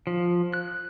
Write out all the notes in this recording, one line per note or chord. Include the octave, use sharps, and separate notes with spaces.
F3
F#6